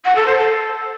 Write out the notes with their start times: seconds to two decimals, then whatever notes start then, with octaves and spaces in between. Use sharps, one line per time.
0.04 F#5
0.15 A4
0.26 C5
0.36 A4